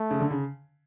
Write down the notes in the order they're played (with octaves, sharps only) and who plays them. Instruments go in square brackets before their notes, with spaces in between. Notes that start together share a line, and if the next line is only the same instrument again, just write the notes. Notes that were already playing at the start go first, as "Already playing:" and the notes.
Already playing: [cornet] A3
[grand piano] C#3
D3
C#3